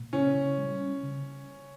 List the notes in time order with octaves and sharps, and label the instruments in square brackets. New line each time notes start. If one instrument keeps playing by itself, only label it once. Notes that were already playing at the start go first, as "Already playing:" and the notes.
Already playing: [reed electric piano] A#2
[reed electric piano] C#3 [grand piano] C#4
[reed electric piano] C#3
G3
C#4
C#3